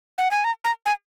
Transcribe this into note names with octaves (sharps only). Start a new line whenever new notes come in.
F#5
G#5
A#5
A#5
G#5